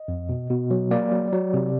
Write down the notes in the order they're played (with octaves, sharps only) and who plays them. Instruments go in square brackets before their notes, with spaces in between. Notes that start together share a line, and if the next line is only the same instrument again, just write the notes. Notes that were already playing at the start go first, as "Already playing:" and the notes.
Already playing: [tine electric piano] D#5
F2
B2
B2
F#3
A#3 D5
F#3
F#3
C3